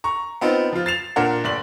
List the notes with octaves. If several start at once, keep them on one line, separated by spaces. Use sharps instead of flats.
A#5 C#6
B3 C4 D#4 F4
F3 F4
A6 C7 E7 F7
A#2 D4 A#4 F#5
G1 D5 F#7